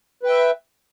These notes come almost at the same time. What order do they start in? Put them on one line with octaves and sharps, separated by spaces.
B4 G5 E5